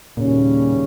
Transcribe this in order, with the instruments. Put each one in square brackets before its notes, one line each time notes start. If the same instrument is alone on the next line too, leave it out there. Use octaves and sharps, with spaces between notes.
[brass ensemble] D#2 C#3 G3 C#4 [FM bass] A#2